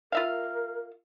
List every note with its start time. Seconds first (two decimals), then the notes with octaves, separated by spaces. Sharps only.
0.12 F4 A#4 E5 F5